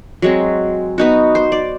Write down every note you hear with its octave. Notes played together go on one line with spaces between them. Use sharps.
F#3 G#3 C4
B3 D#4 F#4
C5
D5